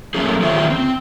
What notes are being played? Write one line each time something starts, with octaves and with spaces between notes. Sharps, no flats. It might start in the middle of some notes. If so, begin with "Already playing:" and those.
F#3 A3 A#3 C#4 G#4
D#3 C#4 F4 G#4 C5 E5
C4